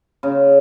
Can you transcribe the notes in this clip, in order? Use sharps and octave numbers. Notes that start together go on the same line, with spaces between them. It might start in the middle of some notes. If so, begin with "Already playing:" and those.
C#3